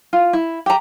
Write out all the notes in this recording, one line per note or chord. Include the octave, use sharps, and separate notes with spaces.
F4
E4
G4 A#5